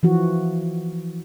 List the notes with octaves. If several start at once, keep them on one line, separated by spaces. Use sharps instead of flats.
E3 F3 F#4